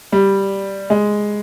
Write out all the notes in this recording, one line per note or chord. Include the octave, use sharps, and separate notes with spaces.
G3
G#3